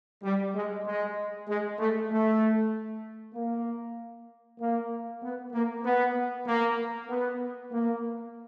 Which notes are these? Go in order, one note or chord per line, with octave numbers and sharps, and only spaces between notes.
G3
G#3
G#3
G#3
A3
A3
A#3
A#3
B3
A#3
B3
A#3
B3
A#3